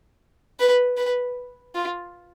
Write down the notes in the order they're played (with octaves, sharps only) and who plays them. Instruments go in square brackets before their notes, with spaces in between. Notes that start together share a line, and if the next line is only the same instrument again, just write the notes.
[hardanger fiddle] B4
B4
F4